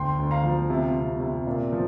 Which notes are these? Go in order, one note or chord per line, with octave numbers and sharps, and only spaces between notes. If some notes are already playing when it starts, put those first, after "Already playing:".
Already playing: D2 G5 C6
D2
F5 A#5
F3
C3
C3
C3
A#2
F3